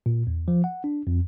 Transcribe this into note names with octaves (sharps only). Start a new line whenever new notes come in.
A#2
E2
F3
F#5
D4
F2